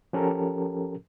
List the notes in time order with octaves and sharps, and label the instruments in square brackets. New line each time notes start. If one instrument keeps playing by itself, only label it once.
[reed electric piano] F3 C#4 G4 A4 A#4